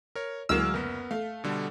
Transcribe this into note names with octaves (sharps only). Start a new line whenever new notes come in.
A#4 C#5
D2 E3 F#3 G#3 A#3 E6 F6
F#1 B3 A#4
A3 F5
B2 D3 G3